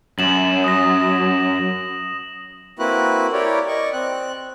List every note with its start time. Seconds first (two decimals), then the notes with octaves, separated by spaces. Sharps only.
0.19 F#2 E7 F#7
0.64 D#6 A#6
2.79 A#3 C4 E4 F#4 B4 F#6
3.33 E4 G4 A#4 C#5 D5
3.68 D5 D#5 C#6
3.93 C4 F#6